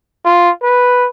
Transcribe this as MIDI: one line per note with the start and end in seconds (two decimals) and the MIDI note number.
0.25 0.50 65
0.63 1.08 71